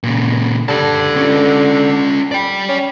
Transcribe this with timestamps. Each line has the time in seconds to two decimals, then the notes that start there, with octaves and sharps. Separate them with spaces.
0.03 A#2 C#3
0.69 D3 G4 A5
1.17 C#4 F4
2.32 D5 G5
2.69 C#4